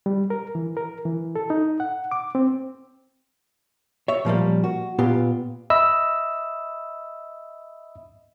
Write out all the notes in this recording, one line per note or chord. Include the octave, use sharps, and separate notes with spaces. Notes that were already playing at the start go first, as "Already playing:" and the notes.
G3
A#4
E3
A#4
E3
A4
D#4
F#5
D6
C4
C#5 E5
A#2 F3 G3 A#3
F#4
A#2 B3 F4 G4
D#5 E5 B5 E6